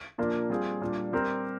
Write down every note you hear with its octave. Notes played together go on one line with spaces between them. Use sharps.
A#2 F3 A#3 D4 F4
G3 C4 F4 G#4
A#2 G3 D4
G3 C4 G4 A#4